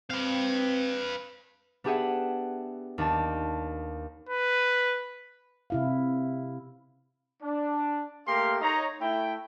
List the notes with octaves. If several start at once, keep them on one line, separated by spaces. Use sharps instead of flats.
C4 B4 F5
B3 D4 G4 G#4 E5 F#5
D#2 D4 A5
B4
C3 E4 F5
D4
A3 A#3 G4 A#4 F5 C6
D#4 C#5 A#5
A3 E4 G5